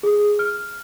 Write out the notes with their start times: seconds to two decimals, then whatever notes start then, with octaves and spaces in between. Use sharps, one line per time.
0.03 G#4
0.39 F6